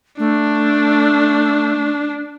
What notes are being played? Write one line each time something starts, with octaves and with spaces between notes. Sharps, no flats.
A3 D4